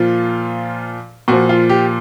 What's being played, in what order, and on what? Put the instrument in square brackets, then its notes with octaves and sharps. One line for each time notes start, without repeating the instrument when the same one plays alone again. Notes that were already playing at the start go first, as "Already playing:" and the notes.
Already playing: [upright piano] A#2 F3 F4
A#2 F3 F#4
F4
G4